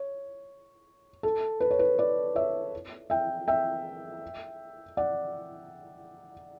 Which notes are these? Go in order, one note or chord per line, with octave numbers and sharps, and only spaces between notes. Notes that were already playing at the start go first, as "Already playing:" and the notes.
Already playing: C#5
A4
B4
C#5
B4
B4 D5
C#5 E5
E5 G5
E5 G5
D5 F#5